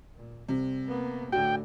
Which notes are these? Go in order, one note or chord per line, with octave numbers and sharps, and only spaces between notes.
A#2
C2 C3
A#3 B3
A2 D3 F#4 G5